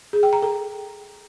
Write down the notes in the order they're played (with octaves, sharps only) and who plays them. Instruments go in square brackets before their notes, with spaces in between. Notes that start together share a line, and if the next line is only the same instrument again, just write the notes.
[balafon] G#4
G5
A#5
A4